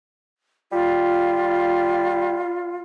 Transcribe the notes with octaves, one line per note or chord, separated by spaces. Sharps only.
G3 F4